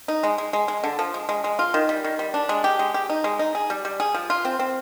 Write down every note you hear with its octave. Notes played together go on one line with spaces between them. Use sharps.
D#4
G#3
G#3
G#3
G#3
D3
F3
G#3
G#3
G#3
F4
D#3
G3
D#3
G3
D4
G#3
G4
G#3
G4
D#4
G#3
D#4
G#4
G3
G3
G#4
F3
F4
C4
C4